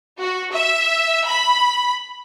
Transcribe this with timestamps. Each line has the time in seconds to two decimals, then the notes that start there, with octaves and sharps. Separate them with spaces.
0.21 F#4
0.54 E5
1.26 B5